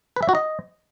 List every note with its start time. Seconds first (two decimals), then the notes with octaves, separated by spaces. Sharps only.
0.16 B4
0.23 E5
0.29 F#4
0.35 D#5